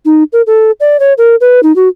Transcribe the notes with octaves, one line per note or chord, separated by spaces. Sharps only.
D#4
A#4
A4
D5
C#5
A#4
B4
D#4
F#4